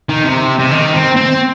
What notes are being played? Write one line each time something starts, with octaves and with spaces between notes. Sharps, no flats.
D#3
C3
C3
D#3
C4
C4